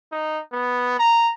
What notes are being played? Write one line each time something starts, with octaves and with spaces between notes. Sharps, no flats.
D#4
B3
A#5